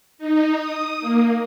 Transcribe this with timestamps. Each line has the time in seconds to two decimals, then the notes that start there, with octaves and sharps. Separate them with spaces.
0.18 D#4
0.54 D#6
1.01 A#3